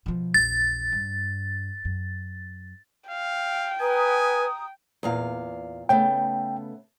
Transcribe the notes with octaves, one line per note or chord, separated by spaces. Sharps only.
B2 F3
A#1 E2 A6
G2
F#2
F5 G5
B4 G#5 A#5 D#6
E2 A#2 F5
C#3 A3 B3 G5